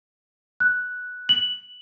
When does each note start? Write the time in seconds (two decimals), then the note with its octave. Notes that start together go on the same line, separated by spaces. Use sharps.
0.60 F#6
1.29 F#7